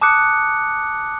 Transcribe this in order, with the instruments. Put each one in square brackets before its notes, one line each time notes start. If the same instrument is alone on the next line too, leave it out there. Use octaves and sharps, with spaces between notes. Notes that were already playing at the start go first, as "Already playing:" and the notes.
[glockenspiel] A5 D6 D#6 F#6 C#7